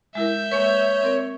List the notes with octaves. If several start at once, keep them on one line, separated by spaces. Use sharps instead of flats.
G#3 E4 A#4 E5 G6
G#3 A#3 B4 C#5
C4 A#4 D5